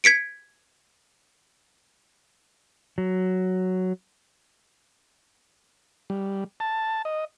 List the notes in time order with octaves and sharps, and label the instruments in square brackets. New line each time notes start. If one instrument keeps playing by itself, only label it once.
[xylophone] G#6 B6 C#7 D7
[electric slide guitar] F#3
[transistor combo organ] G3
A5
D#5